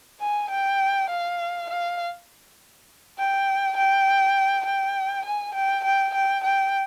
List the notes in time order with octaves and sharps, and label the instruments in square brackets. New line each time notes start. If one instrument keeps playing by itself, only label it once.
[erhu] G#5
G5
F5
F5
G5
G5
G5
G#5
G5
G5
G5
G5